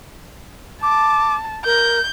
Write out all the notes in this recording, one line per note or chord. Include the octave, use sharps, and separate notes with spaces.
A5 D6
A#4 G6